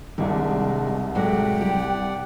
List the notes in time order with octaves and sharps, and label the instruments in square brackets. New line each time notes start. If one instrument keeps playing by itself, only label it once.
[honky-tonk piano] C2 D#3 [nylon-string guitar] C3 [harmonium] G#3 D4
[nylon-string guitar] A2 F#3 G#3 [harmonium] D5 F#5 [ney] G5
[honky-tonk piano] C2 [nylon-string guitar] G4